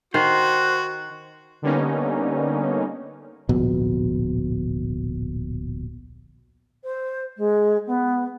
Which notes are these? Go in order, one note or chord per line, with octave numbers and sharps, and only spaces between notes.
D#3 F#4 C5
D3 G3 A#3 B3 C#4 D#4
D1 A#1 B2
C5
G#3
B3